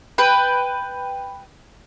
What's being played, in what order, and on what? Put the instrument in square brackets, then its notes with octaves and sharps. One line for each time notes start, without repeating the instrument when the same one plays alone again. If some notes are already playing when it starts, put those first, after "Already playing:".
[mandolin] B4 G5